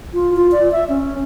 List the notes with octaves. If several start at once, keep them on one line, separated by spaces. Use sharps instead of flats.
F4
F4
D5
E5
C#4